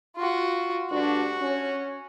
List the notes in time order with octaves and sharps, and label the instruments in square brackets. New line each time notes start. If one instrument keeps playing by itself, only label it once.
[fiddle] F4 F#4
[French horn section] D2 G2 D4 [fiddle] F#4
[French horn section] C#4